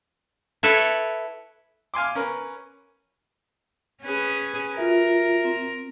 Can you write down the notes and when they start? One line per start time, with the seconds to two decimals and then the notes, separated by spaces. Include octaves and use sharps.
0.63 E4 A4 B4 C#5
1.94 F5 G#5 C6 D6
2.15 C#4 A#4 B4
4.02 C#4 G#4 B4
4.77 F4 F#4 A#4 E5
5.44 C4